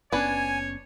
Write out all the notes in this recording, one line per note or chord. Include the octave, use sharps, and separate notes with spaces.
F#1 B3 C#4 D4 B4 C#5 G#5